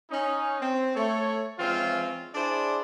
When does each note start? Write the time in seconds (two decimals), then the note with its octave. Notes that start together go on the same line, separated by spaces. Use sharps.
0.11 C#4 D#4
0.61 C4
0.96 A3 C#5
1.59 E3 F3 G#3 C4 C#4 F4
2.34 D4 E4 G#4 C5 D5